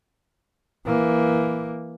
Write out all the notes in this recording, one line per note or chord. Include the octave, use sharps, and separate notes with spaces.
E3 A#3